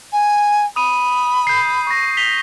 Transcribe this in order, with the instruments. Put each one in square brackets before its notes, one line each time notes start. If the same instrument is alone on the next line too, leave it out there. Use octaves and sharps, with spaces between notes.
[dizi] G#5
[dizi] B5 [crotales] D#6 D#7
[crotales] G6 C7
C#6 A#6
B6 F7 G7